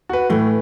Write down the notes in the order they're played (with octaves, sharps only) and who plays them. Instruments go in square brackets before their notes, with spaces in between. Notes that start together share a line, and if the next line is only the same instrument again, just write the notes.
[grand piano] F#4 B4
[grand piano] A2 [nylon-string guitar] E3 A3